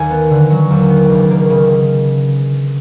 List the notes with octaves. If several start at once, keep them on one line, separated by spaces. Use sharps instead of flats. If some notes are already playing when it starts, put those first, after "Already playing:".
Already playing: D#2 D#3 G#5
B3
D3
F#3
D#2
B3
C#2
A#3
C#3